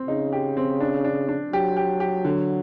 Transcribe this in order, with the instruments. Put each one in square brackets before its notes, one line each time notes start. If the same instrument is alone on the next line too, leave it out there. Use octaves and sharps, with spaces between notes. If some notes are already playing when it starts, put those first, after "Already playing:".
Already playing: [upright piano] C4
[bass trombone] C#3 [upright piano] D#4
[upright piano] G4
C4
D4
D4
D4
[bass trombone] F#3 [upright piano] G4
[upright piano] G4
G4
D3